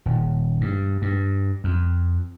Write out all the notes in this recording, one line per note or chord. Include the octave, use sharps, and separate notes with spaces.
D#1
G2
G2
F2